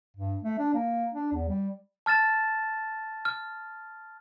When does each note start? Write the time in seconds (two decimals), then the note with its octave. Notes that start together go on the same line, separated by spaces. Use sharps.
0.17 G2
0.44 A3
0.59 D4
0.74 A#3
1.14 D4
1.33 E2
1.48 G3
2.06 A5 F6 A6 E7
3.25 F6